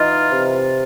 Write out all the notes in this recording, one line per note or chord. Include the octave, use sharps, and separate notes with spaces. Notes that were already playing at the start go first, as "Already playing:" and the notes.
Already playing: E3 D#4 F4
C3